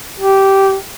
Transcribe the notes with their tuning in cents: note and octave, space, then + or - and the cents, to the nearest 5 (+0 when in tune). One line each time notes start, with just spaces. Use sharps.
G4 -15